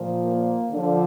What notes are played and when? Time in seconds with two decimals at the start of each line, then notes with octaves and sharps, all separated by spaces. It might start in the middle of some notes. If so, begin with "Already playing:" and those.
Already playing: A#2 F3
0.24 A#3
0.71 D3 F3